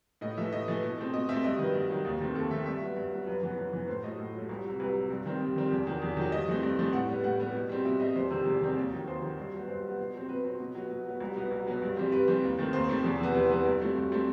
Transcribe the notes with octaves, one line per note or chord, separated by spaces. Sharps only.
A2 D#5
E3 A3 E5
A2 D#5
E3 A3
B2
A3 C4
B2 D#5
A3 C4 E5
G2 D#5
D#3 F#3 B4
G2
D#3 F#3
D#2
D#3 A3 C4
D#2 A4
D#3 A3 C4 E5
G2 E5
F#3 B3
G2
F#3 B3
F#2 B4
E3 B3 B4
F#2
E3 B3
A2 C5
F#3 A3 D#5
A2
F#3 A3
C2
C3 F#3
C2 B4
C3 F#3
G2
D#3 G3 C4
G2
D#3 G3 C4
E2
D#3 F#3
E2
D#3 F#3
G2 D#5
E3 A3 C4
G2
E3 A3 C4
A2 F#5
G3 B3
A2 F#5
G3 B3
B2
G3 C4
B2 E5
G3 C4 D#5
E2 C5
C3 D#3 G3 C4
E2
C3 D#3 G3 C4
D#2
D#3 F#3
D#2 C5
D#3 F#3
G2
F#3 B3
G2 C5
F#3 B3
B2
F#3 C4
B2 B4
F#3 C4
B2
F#3 B3
B2
F#3 B3
C2
B2 F#3 B3
C2
B2 F#3 B3
G2
E3 G3 C4
G2 B4
E3 G3 C4
D#2
D#3 A3 C4
D#2 C5
D#3 A3 C4
E2
C3 E3 B3
E2 B4
C3 E3 B3 B4
G2
F#3 A3 C4
G2
F#3 A3 C4